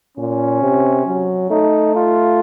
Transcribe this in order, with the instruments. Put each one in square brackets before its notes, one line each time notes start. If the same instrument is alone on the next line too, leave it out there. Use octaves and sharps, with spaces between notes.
[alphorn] A#2 [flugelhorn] C#4
[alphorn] C3
F#3
[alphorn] A3 [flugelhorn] D#4
[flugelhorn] F4